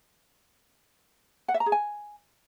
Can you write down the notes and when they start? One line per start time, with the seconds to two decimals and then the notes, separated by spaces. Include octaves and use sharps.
1.48 F#5
1.54 E5
1.60 A#5
1.66 G#4
1.72 G#5